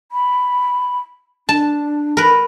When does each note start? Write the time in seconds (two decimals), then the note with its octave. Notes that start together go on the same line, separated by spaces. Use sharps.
0.12 B5
1.49 D4 A5
2.17 A#4 B4